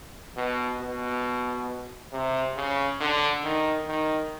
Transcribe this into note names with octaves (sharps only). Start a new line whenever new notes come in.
B2
B2
C3
C#3
D3
D#3
D#3